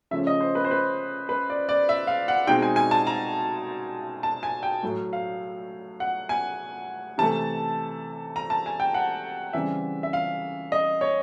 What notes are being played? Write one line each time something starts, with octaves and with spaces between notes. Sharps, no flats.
C#3 F3 A3 C#4 E5
D#5
C5
B4
C5
B4
B4
D5
D5
E5
F5
F#5
B2 G#3 C4 D#4 G5
G#5
G#5
A5
A#5
A5
G#5
G5
A2 F#3 A3
F5
F#5
G#5
C3 E3 A3 A5
A#5
A5
G#5
G5
F#5
C#3 E3 G3 C4 E5
E5
F5
D#5
C#5